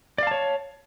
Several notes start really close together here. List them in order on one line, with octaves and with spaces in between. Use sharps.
D5 F5 A5 C#5